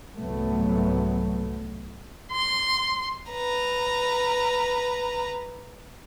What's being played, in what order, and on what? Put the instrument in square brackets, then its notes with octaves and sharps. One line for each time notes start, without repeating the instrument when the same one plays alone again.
[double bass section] C2 G#2 F#3 A3 B3
[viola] C6
[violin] B4 A#5